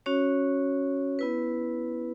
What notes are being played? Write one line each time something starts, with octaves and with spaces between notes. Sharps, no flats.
C#4 F#4 C#5
B3 E4 B4